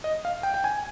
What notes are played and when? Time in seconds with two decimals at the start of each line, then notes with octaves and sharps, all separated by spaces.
0.04 D#5
0.25 F5
0.43 G5
0.54 G5
0.64 G#5